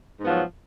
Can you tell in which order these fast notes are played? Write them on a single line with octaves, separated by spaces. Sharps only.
G#2 B3 F3 F#3